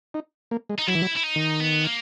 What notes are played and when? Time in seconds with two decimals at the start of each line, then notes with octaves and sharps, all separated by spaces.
0.14 D#4
0.51 A#3
0.69 G#3
0.79 D#4
0.88 F#3 E4
0.95 E3
1.02 F#3
1.17 E4
1.24 D#4
1.36 D#3
1.60 B3
1.85 A#3